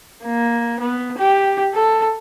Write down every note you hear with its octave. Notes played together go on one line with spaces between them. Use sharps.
A#3
B3
G4
A4